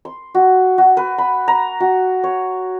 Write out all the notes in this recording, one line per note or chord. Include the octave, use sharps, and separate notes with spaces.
C6
F#4
F#4
B4
B5
A#5
F#4
C#5